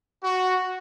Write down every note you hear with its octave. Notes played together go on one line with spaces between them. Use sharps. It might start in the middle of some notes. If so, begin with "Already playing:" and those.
F#4